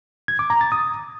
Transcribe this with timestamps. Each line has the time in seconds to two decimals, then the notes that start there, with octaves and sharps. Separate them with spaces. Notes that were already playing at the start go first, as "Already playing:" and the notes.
0.28 G#6
0.39 D6
0.50 A#5
0.61 A6
0.72 D#6